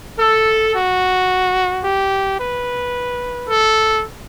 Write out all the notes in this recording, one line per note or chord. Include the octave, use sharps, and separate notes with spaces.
A4
F#4
G4
B4
A4